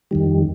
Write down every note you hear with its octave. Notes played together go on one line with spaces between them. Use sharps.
F2 D#3 G3